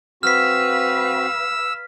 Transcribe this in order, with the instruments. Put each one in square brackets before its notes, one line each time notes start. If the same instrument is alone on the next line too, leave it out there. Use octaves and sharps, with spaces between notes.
[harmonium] C4 F#4 [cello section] B4 F5 [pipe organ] E6 [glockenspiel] F6 B6